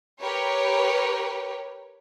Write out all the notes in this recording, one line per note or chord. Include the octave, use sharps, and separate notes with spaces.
G4 A#4 B4 C#5